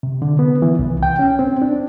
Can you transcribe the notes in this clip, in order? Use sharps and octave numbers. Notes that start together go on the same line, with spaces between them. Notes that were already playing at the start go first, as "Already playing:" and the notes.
C3
D3
B3
E3
C2
G5
C#4
C4
D4